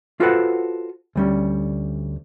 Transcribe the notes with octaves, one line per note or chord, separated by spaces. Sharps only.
F4 F#4 A4 B4 C5 F#5
D2 G3 C#4